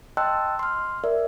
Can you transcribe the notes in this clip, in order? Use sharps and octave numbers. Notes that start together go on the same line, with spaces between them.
D#5 G5 A5 C6 E6 F#6
C6 F6
A#4 D5 E5